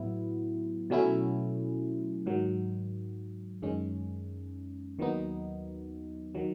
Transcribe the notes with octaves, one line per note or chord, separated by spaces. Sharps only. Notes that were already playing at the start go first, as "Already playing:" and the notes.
Already playing: A2 F#3 B3 E4
B2 F#3 A3 C#4 E4
G#2 D#3 F#3
F#2 D#3 G#3 C#4
D#2 D#3 F#3 B3 D#4
D#3 F#3